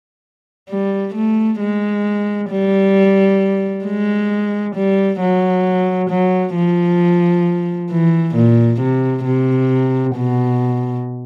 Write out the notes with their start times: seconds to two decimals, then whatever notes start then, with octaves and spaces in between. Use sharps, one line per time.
0.69 G3
1.15 A3
1.60 G#3
2.50 G3
3.85 G#3
4.75 G3
5.20 F#3
6.09 F#3
6.55 F3
7.90 E3
8.35 A#2
8.80 C3
9.25 C3
10.15 B2